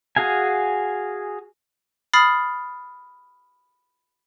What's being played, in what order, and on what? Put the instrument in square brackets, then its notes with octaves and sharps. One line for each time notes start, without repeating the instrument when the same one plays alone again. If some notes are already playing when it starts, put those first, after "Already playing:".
[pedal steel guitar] F#4 G#4 F5 G#5
[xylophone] B5 D#6 F6 A6 C7